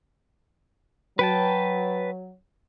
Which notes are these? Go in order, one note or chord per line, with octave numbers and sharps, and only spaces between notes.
F#3 B4 G5 A5